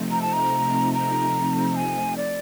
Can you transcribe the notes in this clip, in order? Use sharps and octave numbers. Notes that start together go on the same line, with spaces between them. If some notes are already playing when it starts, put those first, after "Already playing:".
Already playing: C3 F3 A3 C4 D#4
A#5
A5
A#5
A#5
G#5
D5